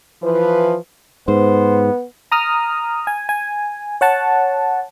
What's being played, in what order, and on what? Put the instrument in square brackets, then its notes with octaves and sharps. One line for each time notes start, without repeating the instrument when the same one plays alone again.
[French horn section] E3 F3 B4
[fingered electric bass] G#2 [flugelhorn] B3 [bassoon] C5
[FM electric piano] A#5 D#6 F6
G#5
G#5
C#5 F#5 A5